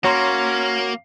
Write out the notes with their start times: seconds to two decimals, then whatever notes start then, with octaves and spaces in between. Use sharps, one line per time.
0.04 A#3 C#4 F#4 C#5 A#5 C6